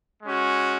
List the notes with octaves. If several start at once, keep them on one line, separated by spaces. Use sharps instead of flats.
G#3 C#4 F#4